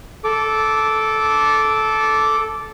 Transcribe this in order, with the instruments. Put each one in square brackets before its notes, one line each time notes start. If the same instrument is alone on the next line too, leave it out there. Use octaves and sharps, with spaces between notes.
[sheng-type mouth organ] A4 D6